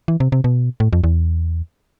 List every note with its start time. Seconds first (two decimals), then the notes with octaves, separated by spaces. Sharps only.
0.08 E3
0.20 C3
0.32 C3
0.44 B2
0.80 A2
0.93 F2
1.04 E2